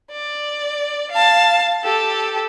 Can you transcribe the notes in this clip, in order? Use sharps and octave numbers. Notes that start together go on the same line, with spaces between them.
D5
F5 A5
G4 A4